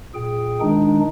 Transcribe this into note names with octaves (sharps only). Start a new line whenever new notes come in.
A#2 G#4 G5
D#3 G#3 D4 D#4